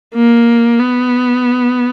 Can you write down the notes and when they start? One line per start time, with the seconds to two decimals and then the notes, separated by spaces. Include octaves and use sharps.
0.15 A#3
0.79 B3